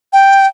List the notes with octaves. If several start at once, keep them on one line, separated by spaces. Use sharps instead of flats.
G5